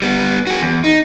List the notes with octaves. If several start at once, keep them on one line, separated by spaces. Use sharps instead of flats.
G3 B3
F#4 G#4
E2
D#4